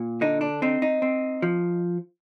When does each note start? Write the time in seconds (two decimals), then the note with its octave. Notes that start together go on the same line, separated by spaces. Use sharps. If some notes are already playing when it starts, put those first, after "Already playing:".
Already playing: A#2
0.21 D3 D#4
0.41 D4
0.62 C4 D#4
0.82 D#4
1.02 C4
1.42 F3